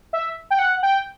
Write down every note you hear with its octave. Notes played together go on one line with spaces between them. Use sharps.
E5
G5
F#5
G5